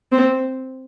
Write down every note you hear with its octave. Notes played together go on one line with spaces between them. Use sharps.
C4